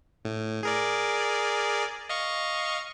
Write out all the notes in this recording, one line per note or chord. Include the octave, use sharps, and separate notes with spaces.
A2
G#4 A#4 D5
D#5 F5 C#6